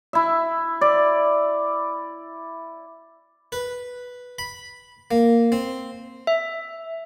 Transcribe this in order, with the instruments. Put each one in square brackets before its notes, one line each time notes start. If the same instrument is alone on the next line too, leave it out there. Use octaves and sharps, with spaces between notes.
[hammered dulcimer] E4 E5
D5
[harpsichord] B4
B5
A#3
C4
[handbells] E5